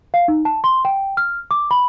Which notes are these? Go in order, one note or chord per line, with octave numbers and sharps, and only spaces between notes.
F5
D#4
A5
C6
G5
F6
D6
B5